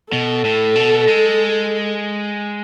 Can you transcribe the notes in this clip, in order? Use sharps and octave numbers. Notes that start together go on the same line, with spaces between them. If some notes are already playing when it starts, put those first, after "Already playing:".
B2 A4
A2
B2
G#3